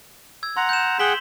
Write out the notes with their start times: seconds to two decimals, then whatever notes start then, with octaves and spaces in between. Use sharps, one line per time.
0.43 E6 G#6
0.57 F#5 A#5 C6
0.69 G6 E7
0.99 G#4 F#5 G5 B6 F#7 G7